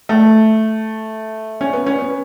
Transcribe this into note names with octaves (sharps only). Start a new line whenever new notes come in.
A3
C#4
B3
C#4
B3